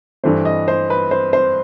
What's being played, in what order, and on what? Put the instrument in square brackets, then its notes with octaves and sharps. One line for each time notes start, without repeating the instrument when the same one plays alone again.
[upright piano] G2 E3 A3 C5
D#5
C5
B4
C5
C5